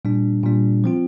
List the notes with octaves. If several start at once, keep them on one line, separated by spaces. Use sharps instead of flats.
A#2 G3 D4
A#2 G3 D4
F3 C4 F4